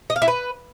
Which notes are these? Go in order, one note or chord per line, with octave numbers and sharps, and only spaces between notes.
D#5
F5
E4
B4